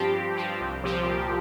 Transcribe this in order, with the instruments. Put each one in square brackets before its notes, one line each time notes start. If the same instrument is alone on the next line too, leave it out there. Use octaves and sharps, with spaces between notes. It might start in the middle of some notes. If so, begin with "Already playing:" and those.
Already playing: [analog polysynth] G2 F3 C4 G4
G2
F3 C4 G4
C2
A#2 F3 C4 G4
C2